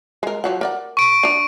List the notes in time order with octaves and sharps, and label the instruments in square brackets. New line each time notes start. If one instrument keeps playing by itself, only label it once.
[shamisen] G#3 A#4
F3 F#3 F#5
A#4 D5 F#5
[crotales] C#6 D7
[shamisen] D4 A#5